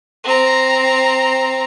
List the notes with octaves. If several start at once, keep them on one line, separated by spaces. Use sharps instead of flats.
C4 A#5